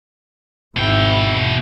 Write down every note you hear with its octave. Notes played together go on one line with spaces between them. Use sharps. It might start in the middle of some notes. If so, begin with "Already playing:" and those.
G#1 B2 E4 G5